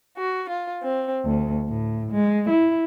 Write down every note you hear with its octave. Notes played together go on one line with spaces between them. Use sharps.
F#4
F4
C4
D2
A2
G#3
E4